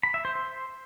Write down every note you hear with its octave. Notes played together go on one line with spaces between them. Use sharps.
B5
E5
C5
C5